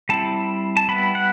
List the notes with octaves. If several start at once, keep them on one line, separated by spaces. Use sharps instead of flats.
G3 C4 E4 A5
A5
G3 B3 E4 B5
F#5